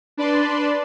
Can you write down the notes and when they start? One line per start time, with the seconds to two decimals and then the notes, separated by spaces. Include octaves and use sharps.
0.17 D4 B4 D5 A5 C6